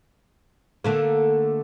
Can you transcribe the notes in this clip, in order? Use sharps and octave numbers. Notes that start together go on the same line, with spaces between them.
D3 A3 A#3